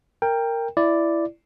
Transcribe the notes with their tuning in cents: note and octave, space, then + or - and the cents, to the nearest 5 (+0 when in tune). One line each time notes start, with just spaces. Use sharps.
A#4 -10 G5 +15
E4 +15 D5 +0